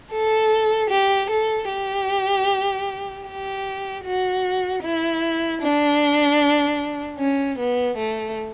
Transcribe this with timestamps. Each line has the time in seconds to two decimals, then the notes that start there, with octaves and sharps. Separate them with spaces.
0.12 A4
0.90 G4
1.30 A4
1.69 G4
3.26 G4
4.05 F#4
4.83 E4
5.62 D4
7.19 C#4
7.59 B3
7.98 A3